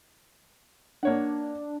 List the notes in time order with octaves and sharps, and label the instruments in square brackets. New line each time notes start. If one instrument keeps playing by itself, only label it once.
[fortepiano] A#3 C#5 F#5 [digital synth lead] D4